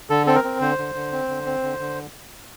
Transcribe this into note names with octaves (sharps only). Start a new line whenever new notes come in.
D3 A4
C4 A4
A#4
C4
D3 C5
D3
D3
C4
D3
C4
D3
D3